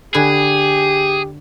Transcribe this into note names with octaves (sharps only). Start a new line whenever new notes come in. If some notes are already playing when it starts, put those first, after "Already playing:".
D3 G4 G#4 B4 G#5